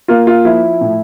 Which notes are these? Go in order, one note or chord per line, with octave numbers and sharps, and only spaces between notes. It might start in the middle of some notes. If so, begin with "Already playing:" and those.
A#3 F4
F4
F3 E4
A2